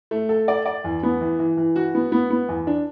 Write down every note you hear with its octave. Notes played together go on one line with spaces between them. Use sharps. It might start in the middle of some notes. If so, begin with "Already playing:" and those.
A3
A4
D5
D5
E2
B3
E3
E3
E3
F#4
B3
B3
B3
E2
D4